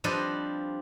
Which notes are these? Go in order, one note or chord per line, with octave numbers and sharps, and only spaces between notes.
F3 G3 C4 D4 B4 D#5